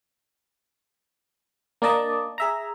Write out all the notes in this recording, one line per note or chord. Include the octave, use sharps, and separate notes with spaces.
A#3 D4 D5 D#5 A5
G#4 E5 A#5